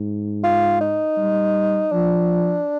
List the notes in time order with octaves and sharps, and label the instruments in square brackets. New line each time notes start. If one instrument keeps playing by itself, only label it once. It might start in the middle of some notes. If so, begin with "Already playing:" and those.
Already playing: [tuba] G#2
[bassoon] F4
D#4
[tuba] G3
[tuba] F3 [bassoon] D4